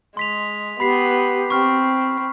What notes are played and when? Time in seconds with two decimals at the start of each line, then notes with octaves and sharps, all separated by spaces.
0.17 G#3 C6 B6 F7
0.80 B3 G4 B5 B6 C7
1.50 C4 C#6 F6